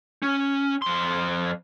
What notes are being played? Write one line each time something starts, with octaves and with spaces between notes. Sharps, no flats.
C#4
F2 C6